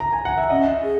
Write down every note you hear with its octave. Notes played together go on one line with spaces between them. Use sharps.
A#5
G#5
F#5
E5
C#4 D#5
G#4